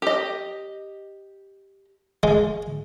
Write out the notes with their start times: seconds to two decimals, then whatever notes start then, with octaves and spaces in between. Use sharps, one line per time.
0.02 G4 D#5
2.23 G#3